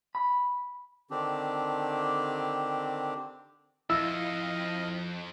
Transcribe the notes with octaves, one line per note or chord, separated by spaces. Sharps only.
B5
D3 D#3 C4 D4 G4
F2 E4 D#5 F5 E6